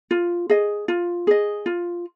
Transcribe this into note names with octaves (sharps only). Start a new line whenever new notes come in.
F4
G#4 D#5
F4
G#4 D#5
F4